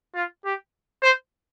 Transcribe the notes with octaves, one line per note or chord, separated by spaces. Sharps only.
F4
G4
C5